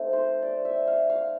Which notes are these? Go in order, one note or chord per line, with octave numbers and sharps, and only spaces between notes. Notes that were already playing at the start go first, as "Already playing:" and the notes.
Already playing: A3 C4 D#4
C5
D5
E5
F5
F5